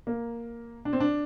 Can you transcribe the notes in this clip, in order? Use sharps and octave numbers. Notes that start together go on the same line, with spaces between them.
A#3
D4
C4
D4